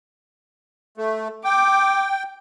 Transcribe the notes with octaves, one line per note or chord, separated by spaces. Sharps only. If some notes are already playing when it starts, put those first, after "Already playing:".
A3
G5 D6